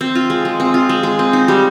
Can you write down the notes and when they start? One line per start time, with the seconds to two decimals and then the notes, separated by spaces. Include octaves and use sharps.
0.01 C4
0.15 F4
0.30 G#3
0.45 G#3
0.60 C4
0.74 F4
0.89 G#3
1.03 G#3
1.19 C4
1.33 D#4
1.48 G3